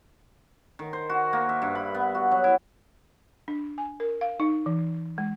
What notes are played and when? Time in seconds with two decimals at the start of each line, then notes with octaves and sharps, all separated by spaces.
0.79 D#3
0.93 C5
1.09 F#4
1.33 A#3
1.49 E5
1.62 G2
1.75 B5
1.94 B3
2.15 F#4
2.31 F#3
2.44 E4
3.48 D4
3.78 G#5
4.00 A#4
4.21 F5
4.40 D#4
4.66 E3
5.18 G#3